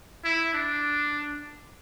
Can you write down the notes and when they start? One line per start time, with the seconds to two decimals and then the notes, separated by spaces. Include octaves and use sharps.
0.24 E4
0.53 D4